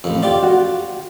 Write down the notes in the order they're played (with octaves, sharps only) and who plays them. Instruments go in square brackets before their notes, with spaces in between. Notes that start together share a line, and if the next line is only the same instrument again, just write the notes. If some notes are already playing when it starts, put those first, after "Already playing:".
[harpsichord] A1 F2
[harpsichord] F4 G4 [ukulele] D5
[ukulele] F#4